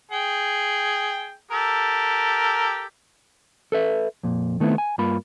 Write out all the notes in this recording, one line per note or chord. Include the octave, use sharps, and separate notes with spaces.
G#4 G5
G4 A4 A#4
A4 B4 E5
F2 A#2
D#3 A3 B3 C4 E4
G#5
G2 A#3 F4 B5